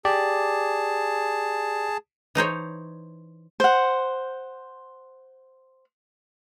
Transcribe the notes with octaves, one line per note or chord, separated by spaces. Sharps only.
G4 G#4 D5 A5
E3 D#4 C5 C#5
C5 F#5